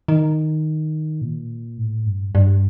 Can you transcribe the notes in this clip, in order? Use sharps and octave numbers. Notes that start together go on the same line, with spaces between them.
D#3
A#2
A2
G2
G2